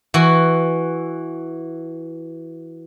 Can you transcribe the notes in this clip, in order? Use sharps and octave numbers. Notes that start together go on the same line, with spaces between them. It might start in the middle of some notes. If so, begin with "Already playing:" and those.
E3 F#4